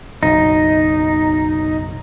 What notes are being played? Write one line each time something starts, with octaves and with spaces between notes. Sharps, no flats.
F#1 B1 D#4